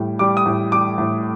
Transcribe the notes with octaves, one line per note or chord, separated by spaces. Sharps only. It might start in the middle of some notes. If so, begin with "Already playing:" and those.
Already playing: A2 G3
G3 D6
D#6
A2
G3 D6
A2